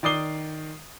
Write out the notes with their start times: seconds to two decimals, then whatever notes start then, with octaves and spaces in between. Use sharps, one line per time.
0.03 D#3 D5 D6 D#6 C7 G7